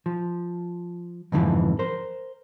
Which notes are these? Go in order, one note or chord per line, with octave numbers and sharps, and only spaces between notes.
F3
F2 G#2 D3 E3 F3
A#4 C5